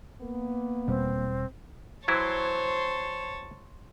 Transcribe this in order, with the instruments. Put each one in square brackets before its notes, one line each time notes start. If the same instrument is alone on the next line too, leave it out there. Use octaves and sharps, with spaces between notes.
[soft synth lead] A#3 [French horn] B3
[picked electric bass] E1 B2 G3 [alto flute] C4
[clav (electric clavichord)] E3 F#3 E4 [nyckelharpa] C5 C6 [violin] C#5 A5